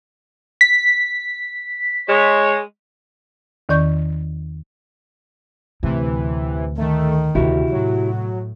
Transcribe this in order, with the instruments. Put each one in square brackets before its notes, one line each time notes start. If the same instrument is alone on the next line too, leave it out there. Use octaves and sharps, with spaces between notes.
[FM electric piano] B6
[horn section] G#3 C#5
[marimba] E2 D#3 C#4 D5 C#6 G6
[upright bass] D2 A2 [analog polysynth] C3 E3
[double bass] D#3 [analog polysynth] A3
[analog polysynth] D2 [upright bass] C3 B3 [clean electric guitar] E4 F#4 G4
[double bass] A2 [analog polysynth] F#3